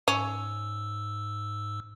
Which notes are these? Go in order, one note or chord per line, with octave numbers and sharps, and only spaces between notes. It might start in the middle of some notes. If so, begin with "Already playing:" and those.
G#2 C#4 E6